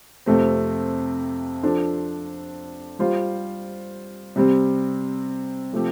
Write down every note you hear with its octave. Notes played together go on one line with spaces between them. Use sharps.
F2 C3 A3 C4
F3 D4 A4 C5
G3 F4 C5
C3 G3 C4
C3 F3 A3 C4 G4